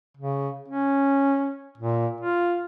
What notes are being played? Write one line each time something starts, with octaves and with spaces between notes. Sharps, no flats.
C#3
C#4
A#2
F4